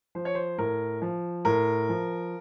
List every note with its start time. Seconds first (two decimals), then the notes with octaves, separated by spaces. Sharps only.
0.15 F3 C5
0.25 C#5
0.35 C5
0.58 A2 A#4
1.02 F3
1.45 A2 A#4
1.89 F3